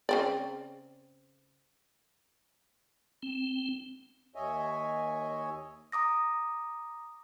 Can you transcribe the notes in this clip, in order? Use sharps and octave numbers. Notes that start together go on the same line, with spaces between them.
C#3 C4 D5
C4
D#2 C#5 D#5 E5 G#5
A#5 D6 D#6 A#6